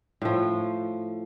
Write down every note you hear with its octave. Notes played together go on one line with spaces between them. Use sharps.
A2 F3